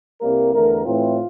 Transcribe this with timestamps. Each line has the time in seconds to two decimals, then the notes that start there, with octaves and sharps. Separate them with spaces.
0.21 C2 C3 G3 A#3 A#4
0.53 E2 D3 A3 A#4
0.85 A2 E3 A3 C4 F4